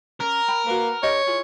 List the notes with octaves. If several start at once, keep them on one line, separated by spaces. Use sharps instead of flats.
C#4 A#4
G5 B5
A#3 F#4 B4
D4 G4 C#5 D#5
E4 F4 G#4